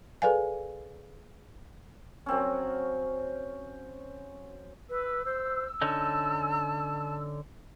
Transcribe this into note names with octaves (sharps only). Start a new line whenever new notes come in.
G#4 A4 B4 D5 F5 G#5
F#3 C4 C#4
B4 E6
C5
D3 C#4 D#4 A5